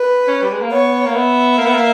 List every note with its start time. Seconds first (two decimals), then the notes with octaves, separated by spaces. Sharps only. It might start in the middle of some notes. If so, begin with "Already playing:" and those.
Already playing: B4
0.28 C#4
0.42 G3
0.52 G#3
0.62 A#3
0.71 B3 C#5
1.06 A#3
1.15 B3 E5
1.58 A#3
1.66 B3
1.74 A#3